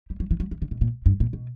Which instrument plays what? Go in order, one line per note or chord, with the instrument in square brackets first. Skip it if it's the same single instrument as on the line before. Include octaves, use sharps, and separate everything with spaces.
[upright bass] G3
F#3
E3
F#3
E3
D3
B2
A#2
G2
A#2
B2